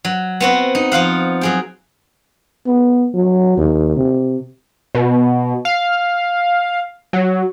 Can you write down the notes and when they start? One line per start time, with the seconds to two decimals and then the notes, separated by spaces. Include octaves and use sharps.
0.05 F#3
0.40 B3 C4 F#4
0.75 D#4
0.92 F3 F4 F5 F#5
1.41 F#3 G#4 G5
2.66 B3
3.14 F#3
3.57 D#2
3.96 C3
4.95 B2
5.65 F5
7.13 F#3